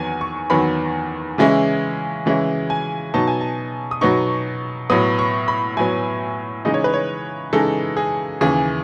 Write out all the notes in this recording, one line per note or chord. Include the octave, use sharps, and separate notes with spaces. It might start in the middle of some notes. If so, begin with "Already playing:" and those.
Already playing: E2 D#3 F#3 B3 G#5
C#6
E2 D#3 F#3 B3 B5
C#3 E3 G#3 C#4 E4
C#3 E3 G#3 C#4 E4
G#5
B2 F#3 B3 D#4 A5
G#5
A5
D#6
B2 F#3 B3 D#4 C#6
A2 F#3 B3 D#6
C#6
B5
A2 F#3 B3 G#5
C#3 E3 G#3 D#4 D#5
C#5
B4
C#5
C#3 E3 G#3 D#4 A4
G#4
D#2 C#3 E3 G#4